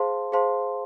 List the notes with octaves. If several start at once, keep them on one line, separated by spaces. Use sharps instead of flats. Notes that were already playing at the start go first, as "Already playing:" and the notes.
Already playing: G#4 C5 F5 A5 C6
G#4 C5 F5 A5 C6